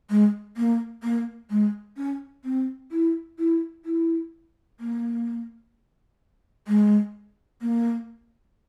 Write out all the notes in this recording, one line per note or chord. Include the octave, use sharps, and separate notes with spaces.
G#3
A#3
A#3
G#3
C#4
C4
E4
E4
E4
A#3
G#3
A#3